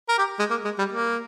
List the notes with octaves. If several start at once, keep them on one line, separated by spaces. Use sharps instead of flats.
A#4
G4
G#3
A#3
G#3
G3
A#3